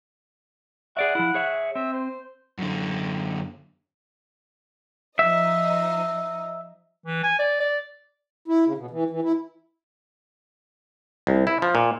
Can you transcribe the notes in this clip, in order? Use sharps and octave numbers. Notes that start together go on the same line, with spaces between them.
G#4 D5 E5 F#5
F3 E4
G#4 C#5 E5
C4 E5
C5
F#2 D3
F3 D#4 D#5 E5
E3
G#5
D5
D5
E4
C#3
B2
E3
E3
E4
C2
E4
F3
A#2